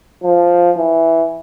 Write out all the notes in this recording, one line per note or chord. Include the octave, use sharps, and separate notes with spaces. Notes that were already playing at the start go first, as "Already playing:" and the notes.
F3
E3